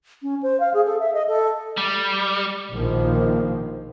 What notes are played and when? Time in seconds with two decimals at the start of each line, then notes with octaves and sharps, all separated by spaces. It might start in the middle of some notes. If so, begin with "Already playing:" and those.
0.22 C#4
0.43 C5
0.60 F5
0.74 G#4
0.86 A4
1.00 E5
1.14 D#5
1.28 A4
1.77 G3
2.72 A#1 B2 D#3 F3 A#3